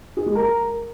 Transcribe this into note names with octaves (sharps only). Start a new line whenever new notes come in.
G#4
G#3
A#4